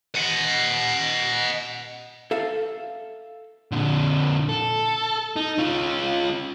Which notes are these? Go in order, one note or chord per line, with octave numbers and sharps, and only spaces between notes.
D#5 F#5
A4 E5 F5
A#2 D3
A4
D#4
C#4 F4